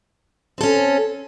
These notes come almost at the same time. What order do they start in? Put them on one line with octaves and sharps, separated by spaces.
C4 A4 C#4